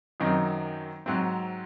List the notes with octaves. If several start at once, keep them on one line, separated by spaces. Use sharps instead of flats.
F#2 D#3 F#3 C4 D#4
G#2 F#3 C4